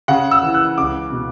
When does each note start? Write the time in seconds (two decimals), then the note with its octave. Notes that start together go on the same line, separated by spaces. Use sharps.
0.08 C#3 F#5
0.31 E6
0.43 E3
0.54 F#6
0.78 C#2 D6
1.12 B2